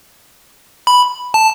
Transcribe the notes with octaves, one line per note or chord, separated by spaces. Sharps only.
B5
A5